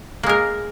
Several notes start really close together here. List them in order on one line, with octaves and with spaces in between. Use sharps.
A#3 G#3 A#4